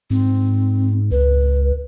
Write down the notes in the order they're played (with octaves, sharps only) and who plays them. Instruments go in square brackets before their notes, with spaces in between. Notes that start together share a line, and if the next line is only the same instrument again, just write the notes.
[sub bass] G#2 [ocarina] C4
[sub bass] C#2 [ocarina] B4